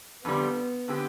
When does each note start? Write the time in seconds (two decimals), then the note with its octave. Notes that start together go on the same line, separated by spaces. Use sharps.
0.25 F2 D3 G3 B3
0.88 D3 G#3 C4 G4